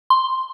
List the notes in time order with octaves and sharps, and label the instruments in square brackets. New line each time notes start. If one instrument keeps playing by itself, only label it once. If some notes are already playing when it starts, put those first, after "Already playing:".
[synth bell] C6